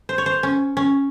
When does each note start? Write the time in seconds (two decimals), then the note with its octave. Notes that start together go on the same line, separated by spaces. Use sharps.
0.09 C5
0.18 C#5
0.26 C5
0.43 C#4
0.77 C#4